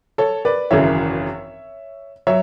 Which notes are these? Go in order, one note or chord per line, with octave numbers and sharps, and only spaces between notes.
A4 C#5
B4 D5
G#1 F#2 C#3 E3 C#5 E5
F#3 C#5 E5